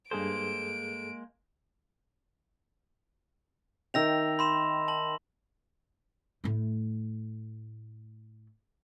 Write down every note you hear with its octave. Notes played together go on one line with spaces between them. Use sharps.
G2 G#3 A#3 G#4 A4 C5 D7
D#3 E5 G5 E6 A#6 F7
B5 C6 E7
A5 F#7
A2 A3